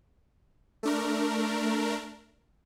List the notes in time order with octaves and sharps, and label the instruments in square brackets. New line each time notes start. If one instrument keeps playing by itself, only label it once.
[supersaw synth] A3 D4 A#4